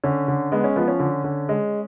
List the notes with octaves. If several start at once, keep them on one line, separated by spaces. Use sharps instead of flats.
D3 C#4
D3
G#3 B3
C#4
F3 B3
C#4
D3
D3
G#3